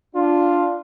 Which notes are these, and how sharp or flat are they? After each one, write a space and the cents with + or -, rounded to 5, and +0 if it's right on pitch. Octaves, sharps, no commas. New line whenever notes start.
D4 +0 F4 +0